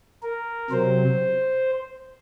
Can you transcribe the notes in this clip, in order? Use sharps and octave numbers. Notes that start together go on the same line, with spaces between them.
A#4
C3 F#3 C4 C5